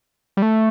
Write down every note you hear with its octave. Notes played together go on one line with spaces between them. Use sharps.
G3
A3